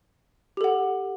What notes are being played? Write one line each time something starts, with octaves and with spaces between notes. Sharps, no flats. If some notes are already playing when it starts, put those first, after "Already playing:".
G4 A4 F#5